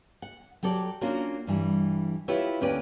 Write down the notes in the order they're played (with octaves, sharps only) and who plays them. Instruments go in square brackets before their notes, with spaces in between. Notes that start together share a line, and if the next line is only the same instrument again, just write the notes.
[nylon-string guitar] F#5
F#3 G4 A4 D5
A#3 C#4 D4 F4 F#4 A#4
G2 E3 G3
E4 F4 G4 B4 C#5 E5
D2 A#3 C#4 G4 B4 D5